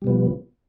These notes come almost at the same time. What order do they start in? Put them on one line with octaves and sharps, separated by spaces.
G3 B2 B3 F3